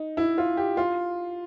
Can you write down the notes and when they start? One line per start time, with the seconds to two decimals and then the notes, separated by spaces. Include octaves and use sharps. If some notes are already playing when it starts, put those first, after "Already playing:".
Already playing: D#4
0.17 E4
0.38 F4
0.57 G4
0.77 F4